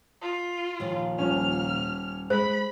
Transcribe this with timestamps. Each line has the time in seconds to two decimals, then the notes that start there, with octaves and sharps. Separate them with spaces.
0.21 F4
0.80 D#2 A#2 F3
1.19 D#1 C#4 F6
2.30 G#3 C5 B5